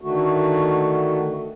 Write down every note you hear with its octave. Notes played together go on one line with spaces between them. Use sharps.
D3 D#3 A3 F#4